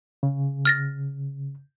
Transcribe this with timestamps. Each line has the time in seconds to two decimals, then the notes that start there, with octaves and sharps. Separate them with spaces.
0.23 C#3
0.65 F6 A6 A#6